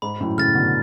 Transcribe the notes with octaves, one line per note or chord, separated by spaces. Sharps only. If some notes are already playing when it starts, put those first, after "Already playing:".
G#2 B5
F#2 A2
A2 C#3 F6 A6
B2 D3